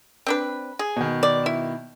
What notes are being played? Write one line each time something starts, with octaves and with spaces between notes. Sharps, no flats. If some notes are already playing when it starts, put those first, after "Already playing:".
C4 D4 B4
G#4
B2 D#3
D5
E4